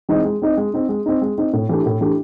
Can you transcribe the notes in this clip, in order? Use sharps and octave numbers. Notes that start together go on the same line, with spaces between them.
E3 G#3 C4 D#4
G#3
C4 D#4
G#3
C4 D#4
G#3
C4 D#4
G#3
C4 D#4
A2
E3 A3 D4 G4
A2
E3 A3 D4 G4